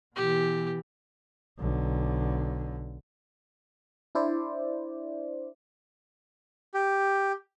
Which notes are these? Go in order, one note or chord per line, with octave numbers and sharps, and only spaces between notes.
B2 E3 G4
B1 D3
D4 E4 C5 D5
G4